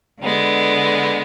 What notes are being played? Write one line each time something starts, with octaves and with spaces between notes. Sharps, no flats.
D3 G#3 B3